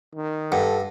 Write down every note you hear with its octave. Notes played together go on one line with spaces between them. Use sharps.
D#3
G2 A4 F#5